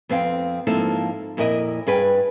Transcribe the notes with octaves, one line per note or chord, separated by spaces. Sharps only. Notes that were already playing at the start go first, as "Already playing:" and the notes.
F2 B3 C4 F5 G5
G#2 F3 A#3 C4 E4 A4
F2 A#2 E4 A#4 D#5
G2 G#4 B4 G5